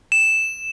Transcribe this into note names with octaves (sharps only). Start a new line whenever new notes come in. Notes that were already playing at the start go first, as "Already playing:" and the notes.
E7